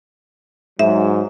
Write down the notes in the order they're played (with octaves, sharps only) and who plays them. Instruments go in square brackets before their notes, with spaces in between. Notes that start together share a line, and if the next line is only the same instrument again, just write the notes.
[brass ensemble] G#2 F#3 [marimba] E5